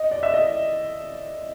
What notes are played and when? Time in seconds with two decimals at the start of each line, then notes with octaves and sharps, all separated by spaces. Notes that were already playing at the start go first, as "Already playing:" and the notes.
Already playing: D#5
0.11 D5
0.23 E5
0.34 D#5